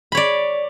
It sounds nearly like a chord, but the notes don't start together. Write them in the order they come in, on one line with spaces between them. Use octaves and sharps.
B5 C#5 D5